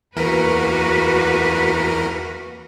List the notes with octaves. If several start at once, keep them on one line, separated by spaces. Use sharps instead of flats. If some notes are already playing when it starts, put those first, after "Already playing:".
E2 E3 A#3 F#4 A#4 B4